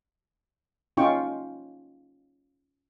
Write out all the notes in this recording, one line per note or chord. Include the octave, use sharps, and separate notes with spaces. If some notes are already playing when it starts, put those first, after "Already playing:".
C#4 D#4 F4 G5 C#6